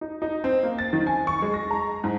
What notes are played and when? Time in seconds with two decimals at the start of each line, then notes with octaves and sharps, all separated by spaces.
0.01 D#4
0.22 D#4
0.44 C4
0.63 A#3
0.79 A6
0.93 D#3
1.07 G#5
1.27 C#6
1.42 G#3
1.54 A#6
1.71 A#5
2.04 G#2